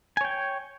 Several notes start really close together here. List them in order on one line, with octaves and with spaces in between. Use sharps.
G#5 C#5 G5